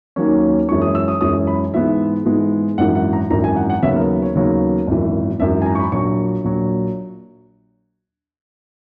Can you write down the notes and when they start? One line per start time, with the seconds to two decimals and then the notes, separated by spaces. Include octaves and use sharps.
0.16 D#2 D#3 F#3 A#3 C#4
0.69 F#2 E3 G#3 C#4 C#6
0.82 D#6
0.95 E6
1.08 D#6
1.21 F#2 E3 G#3 C#4 D#6
1.47 B5
1.74 G#2 E3 G#3 B3 E5
2.26 G#2 E3 G#3 B3
2.78 G#1 F#2 E3 F#5
2.95 F#5
3.13 A#5
3.30 G#1 F#2 E3 A#5
3.44 G#5
3.57 F#5
3.70 F#5
3.83 D#2 C#3 F#3 B3 E5
3.96 A#4
4.22 C#5
4.35 D#2 C#3 F#3 B3
4.87 G#1 F#2 E3
5.40 G#1 F#2 E3 E5
5.62 G#5
5.66 A#5
5.75 C#6
5.79 B5
5.92 A#1 A#2 F#3 C#6
6.45 A#1 A#2 F#3